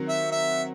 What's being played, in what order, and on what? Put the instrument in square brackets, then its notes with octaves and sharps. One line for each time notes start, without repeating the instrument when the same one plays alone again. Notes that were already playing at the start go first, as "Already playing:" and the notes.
Already playing: [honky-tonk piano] D#3 F#3 C4 F#4
[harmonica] E5
E5